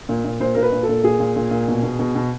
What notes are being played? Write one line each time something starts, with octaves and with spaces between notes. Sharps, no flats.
A#2
A#2
A#2 C5
A#2 A#4
B4
A#2
A4
A#2
A#2 G#4
A#2
A#2
A#2
B2
B2
B2
B2